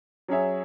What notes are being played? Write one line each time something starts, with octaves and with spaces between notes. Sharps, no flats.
F#3 C#4 G#4 C#5 E5